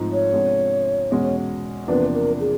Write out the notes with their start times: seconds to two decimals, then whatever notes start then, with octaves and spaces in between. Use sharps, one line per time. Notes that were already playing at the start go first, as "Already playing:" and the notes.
Already playing: G#2 F3 A3 C4 D#4
0.13 C#5
0.32 C3 F3 G#3 B3 D4
1.11 E2 B2 G#3 C#4 F#4
1.88 E2 C3 F3 A#3 D4 B4
2.14 A#4
2.40 G#4